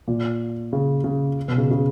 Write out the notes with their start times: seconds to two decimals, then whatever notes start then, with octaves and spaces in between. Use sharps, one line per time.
0.08 A#2
0.73 C#3
1.04 C#3
1.48 B2
1.58 C#3
1.71 C#3